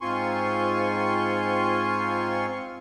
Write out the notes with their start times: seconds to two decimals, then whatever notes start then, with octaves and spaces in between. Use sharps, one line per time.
0.01 G#2 C4 F4 G#5 C6 C#6